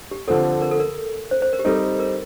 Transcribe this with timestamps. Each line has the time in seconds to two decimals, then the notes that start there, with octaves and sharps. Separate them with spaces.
0.11 G4
0.28 D3 F3 C4 A4
0.62 A#4
0.71 A4
0.79 A#4
1.31 C5
1.42 C5
1.53 A#4
1.59 G4
1.65 G3 C4 D#4 A4
2.00 A#4